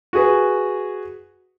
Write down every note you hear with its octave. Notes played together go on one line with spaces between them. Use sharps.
F#4 G#4 B4